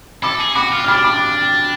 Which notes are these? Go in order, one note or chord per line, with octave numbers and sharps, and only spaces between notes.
A4 B5 D6
G#4
F#4 B5 D6
F4
F6
D4 B5 D6
B5 D6